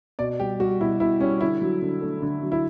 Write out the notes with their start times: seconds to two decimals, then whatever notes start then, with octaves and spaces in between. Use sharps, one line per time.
0.19 B2 D5
0.40 G3 G4
0.60 G3 F#4
0.81 B2 E4
1.00 B2 E4
1.20 G3 C#4
1.41 D3 E4
1.62 F#3
1.82 D3
2.02 A3
2.22 D3
2.42 F#3
2.52 E4